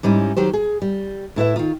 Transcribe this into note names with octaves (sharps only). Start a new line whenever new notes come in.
G#2 G3 C#4 D#4 E4
D#3 F#3 G4 C5
G#4
G3
A2 E4 B4 E5
D#3 F4